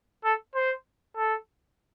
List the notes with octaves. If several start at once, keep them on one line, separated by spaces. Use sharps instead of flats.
A4
C5
A4